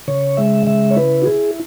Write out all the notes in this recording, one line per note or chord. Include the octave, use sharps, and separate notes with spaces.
C#3 C#5
G#3 E5
C#3 E5
C#5
E4 B4
F#4
E4 G#4